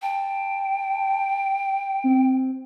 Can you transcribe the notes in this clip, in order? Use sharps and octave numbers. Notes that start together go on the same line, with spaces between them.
G5 A5
C4